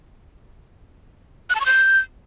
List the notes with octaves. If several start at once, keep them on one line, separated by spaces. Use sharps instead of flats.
F#6
A5
C#6
G6